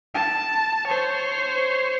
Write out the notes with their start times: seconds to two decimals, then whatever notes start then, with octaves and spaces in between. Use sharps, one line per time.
0.15 A5
0.88 C5 C#5